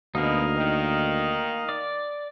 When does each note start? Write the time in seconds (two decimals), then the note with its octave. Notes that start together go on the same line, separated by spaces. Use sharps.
0.15 D2 B2 A#3 D#4 D#5 F5
0.58 D#3
1.69 D5